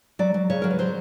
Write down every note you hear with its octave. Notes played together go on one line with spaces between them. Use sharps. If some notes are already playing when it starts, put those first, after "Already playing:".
F#3 D5
F#3
C#3 C#5
F#3 A#4
B4
F#3 C5